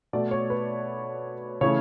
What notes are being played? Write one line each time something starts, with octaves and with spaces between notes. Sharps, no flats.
B2 A3 D5
C#5
B4
C#3 E3 A3 C#5